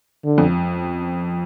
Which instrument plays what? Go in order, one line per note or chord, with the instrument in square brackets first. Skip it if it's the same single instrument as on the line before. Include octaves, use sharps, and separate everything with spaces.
[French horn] D3
[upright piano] F2